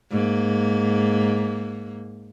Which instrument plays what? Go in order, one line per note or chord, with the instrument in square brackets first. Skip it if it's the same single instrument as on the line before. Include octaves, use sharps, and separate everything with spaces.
[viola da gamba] G#2 A#3